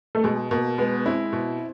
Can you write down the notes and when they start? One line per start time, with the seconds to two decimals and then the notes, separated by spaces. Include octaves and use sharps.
0.15 A3
0.23 B2 G#3
0.51 B2 A#3
0.78 G#3 B3
1.06 C4 E4
1.33 B2